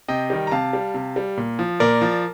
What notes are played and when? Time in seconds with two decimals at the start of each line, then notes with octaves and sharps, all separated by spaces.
0.08 C3 D#5 G5
0.30 D#3 G3
0.47 A#5
0.51 C3 F5 A5
0.73 G3
0.94 C3
1.16 G3
1.37 A#2
1.59 F3
1.80 A#2 A#4 D5
2.01 F3